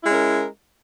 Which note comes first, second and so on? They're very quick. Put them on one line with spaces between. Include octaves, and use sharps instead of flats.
E4 G#3 C#4 A#4